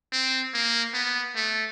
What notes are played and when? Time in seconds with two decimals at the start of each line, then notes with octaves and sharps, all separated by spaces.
0.13 C4
0.54 A#3
0.94 B3
1.36 A3